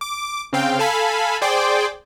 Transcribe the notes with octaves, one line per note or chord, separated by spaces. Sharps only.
D6
C#3 C4 F5 G5
A4 F5 G#5 A5 B5
G#4 C5 D5 G5 C6 D6